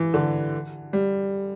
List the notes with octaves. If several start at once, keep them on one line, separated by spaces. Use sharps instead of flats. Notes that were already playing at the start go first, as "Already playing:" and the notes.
Already playing: E3
D3
G3